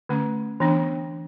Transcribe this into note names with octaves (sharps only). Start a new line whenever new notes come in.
D3 A3 C#4
E3 B3 D4